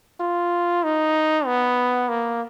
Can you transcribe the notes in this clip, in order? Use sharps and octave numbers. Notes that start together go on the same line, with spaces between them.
F4
D#4
B3
A#3